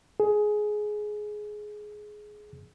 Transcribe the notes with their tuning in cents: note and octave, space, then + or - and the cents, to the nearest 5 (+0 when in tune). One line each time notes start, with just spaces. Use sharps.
G#4 +15